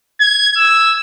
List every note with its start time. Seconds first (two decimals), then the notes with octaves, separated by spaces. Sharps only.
0.20 G#6
0.57 E6